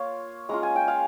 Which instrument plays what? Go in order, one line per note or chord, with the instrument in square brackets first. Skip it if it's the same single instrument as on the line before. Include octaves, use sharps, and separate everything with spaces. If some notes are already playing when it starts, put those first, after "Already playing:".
Already playing: [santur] A#3 F4 C#5 F5
G#3 C#4 F4 A#5
G#5
G5
F5 G#5